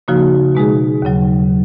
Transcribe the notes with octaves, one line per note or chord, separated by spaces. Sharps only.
C#3 F3 A#3 D#4 F#4
B2 G#3 D#4 G#4
D#2 C#3 F#3